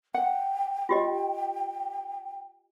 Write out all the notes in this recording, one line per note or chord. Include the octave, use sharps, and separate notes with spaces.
F#5 G5
F4 G4 D#5